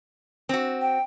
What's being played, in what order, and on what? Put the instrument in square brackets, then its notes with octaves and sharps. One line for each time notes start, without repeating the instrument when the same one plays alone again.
[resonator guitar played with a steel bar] C4 F#4
[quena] G5